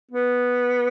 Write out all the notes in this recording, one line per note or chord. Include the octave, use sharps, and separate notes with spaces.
B3